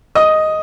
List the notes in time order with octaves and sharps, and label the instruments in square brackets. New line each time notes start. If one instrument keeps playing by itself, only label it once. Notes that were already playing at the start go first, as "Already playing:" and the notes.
[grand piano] D#5 D#6